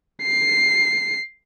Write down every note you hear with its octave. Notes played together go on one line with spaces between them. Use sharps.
C7